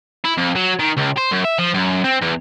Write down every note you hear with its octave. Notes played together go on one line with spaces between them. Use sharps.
E4
F2
F#3
D#3
C#2
C5
F#2
E5
F3
F#2
C4
E2